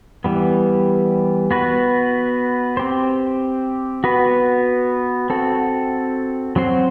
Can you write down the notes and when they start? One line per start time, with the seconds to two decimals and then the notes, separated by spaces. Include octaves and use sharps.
0.24 E3 G3 B3
1.51 B3 F#4 B4
2.77 C4 G4 C5
4.04 B3 F#4 B4
5.30 C4 F#4 A4
6.56 F#3 C4 F#4 C5